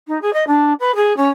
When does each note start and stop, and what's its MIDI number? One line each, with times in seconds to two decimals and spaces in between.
0.08 0.20 63
0.22 0.33 68
0.33 0.44 75
0.47 0.73 62
0.80 0.95 71
0.95 1.16 68
1.17 1.29 61